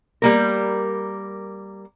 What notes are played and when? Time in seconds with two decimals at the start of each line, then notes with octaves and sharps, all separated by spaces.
0.22 G3 A#3 A#4